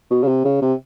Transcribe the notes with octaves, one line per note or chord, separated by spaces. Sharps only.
B2
C#3
C3
C#3
C3